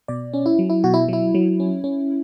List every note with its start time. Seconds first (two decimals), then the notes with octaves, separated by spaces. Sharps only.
0.08 B2 D5
0.33 C#4
0.46 E4
0.59 F#3
0.70 E4
0.84 B2 F#4
0.94 E4
1.08 F#3 E4
1.35 F#3
1.60 C#4
1.84 C#4